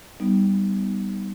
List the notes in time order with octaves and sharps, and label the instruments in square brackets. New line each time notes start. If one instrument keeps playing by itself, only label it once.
[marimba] G3 B3 D#4